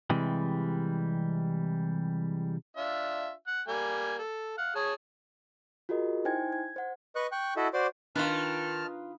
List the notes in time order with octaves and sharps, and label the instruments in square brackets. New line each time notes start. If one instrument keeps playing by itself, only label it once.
[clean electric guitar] C3 E3 G3 G#3
[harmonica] D4 F4 E5
F#5
G3 A#3 G#5
A4
F5 F#5
G#4 C#5 A5
[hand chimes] F4 F#4 G#4 A#4 D#5
D#4 E4 C5 G5 G#5 G#6
G#6
C5 F#5
[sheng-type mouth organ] B4 D#5 C#6 F#6
G5 C#6 F#6
E4 F#4 A4 D#5 E5
F#4 C5 D5 C6 D6
[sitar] D#3 [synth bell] D4 A#5 [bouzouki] F4 B4 [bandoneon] A5 F6